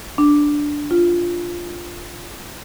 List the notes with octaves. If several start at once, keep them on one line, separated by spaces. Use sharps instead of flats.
D4
F4